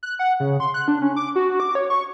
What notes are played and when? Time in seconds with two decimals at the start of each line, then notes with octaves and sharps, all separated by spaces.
0.03 F#6
0.19 F#5
0.40 C#3
0.60 C6
0.74 F#6
0.88 D4
1.02 C#4
1.16 D6
1.36 F#4
1.60 D6
1.75 C#5
1.90 C#6